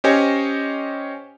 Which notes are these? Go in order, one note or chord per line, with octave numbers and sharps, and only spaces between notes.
C#4 G4 C5 C#5 D#5 G#5